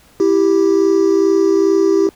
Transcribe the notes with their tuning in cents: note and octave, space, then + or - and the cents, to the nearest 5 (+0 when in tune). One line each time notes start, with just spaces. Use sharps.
E4 +0 G4 +0